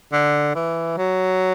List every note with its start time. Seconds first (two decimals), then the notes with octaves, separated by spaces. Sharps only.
0.12 D3
0.55 E3
0.98 F#3